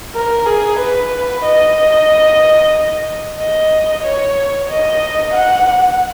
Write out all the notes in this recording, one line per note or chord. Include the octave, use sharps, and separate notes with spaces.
A#4
G#4
B4
D#5
D#5
C#5
D#5
F#5